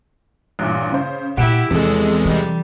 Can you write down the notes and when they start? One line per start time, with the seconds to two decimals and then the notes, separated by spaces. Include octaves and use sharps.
0.59 A1 G2 A#2
0.92 C#3 C5
1.37 A#2 D#3 E4 G4 F#5 D7 E7
1.70 E2 C3 F3 G#3 A4
2.25 E3 G3